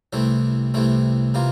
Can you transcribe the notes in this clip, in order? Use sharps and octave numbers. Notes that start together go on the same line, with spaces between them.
C2 C3 E3 A3 C4
C2 C3 E3 A3 C4
C3 E3 A#3 F4